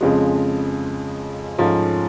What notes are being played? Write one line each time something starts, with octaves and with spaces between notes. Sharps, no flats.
F2 C#3 F3 G#3
G#2 F3 A3 C#4 F4